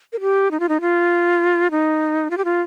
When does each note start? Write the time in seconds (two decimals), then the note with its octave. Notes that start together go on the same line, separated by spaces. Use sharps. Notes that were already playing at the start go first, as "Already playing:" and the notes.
0.13 A#4
0.21 G4
0.51 D#4
0.60 F4
0.69 D#4
0.81 F4
1.71 D#4
2.30 F4
2.38 G4
2.45 F4